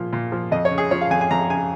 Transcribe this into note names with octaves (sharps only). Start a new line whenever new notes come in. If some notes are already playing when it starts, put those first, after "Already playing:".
Already playing: A#2 F3
A#2
F3
F2 D#5
C#5
C#3
G#4
F3 C#5
F5
F2 G#5
G#5
F2 A#5
C#3 G#5